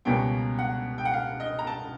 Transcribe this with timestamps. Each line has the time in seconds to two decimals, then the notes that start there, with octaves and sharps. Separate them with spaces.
0.05 C#2 B2 G3 A#3 C#4 G5
0.59 F#5
0.98 G5
1.05 F#5
1.13 F5
1.40 D#5
1.59 A#5
1.67 A5